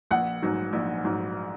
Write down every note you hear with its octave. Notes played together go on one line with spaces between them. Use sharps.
A#1 F#5
G#2 F#3
A#1
G#2 F#3